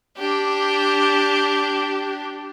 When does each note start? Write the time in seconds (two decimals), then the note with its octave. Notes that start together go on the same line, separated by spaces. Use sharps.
0.17 D4 G4